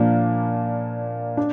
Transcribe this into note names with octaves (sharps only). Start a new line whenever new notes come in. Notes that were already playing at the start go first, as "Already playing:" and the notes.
Already playing: A#2 F3 A#3 D4
D4